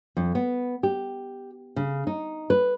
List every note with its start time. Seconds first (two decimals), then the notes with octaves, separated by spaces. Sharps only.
0.17 F2
0.35 B3
0.83 G4
1.76 C#3
2.07 D#4
2.50 B4